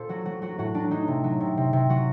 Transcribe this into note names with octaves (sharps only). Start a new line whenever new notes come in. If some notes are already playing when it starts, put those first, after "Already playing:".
Already playing: A#2 A4 C5
F#3 F#4
F#3 F#4
F#3 F#4
A2 F#4
F#3 D4
F#3 D#4
C3
F#3
C3
C3
C3
F#3 F#4